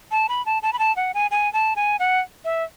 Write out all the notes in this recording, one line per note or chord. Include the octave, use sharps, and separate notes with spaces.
A5
B5
A5
A5
B5
A5
F#5
G#5
G#5
A5
G#5
F#5
E5